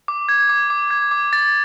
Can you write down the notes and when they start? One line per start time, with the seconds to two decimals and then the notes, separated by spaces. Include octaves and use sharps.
0.08 D6
0.29 G#6
0.49 D6
0.70 D6
0.91 G#6
1.11 D6
1.33 A6